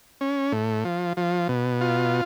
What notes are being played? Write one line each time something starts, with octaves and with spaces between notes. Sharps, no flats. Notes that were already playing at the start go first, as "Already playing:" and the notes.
C#4
A2
F3
F3
B2
F4